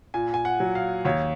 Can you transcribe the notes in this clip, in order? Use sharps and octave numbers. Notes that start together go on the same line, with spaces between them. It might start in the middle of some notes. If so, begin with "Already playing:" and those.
A#2 G#5
G#5
F#5
F#3
F5
D#2 C#5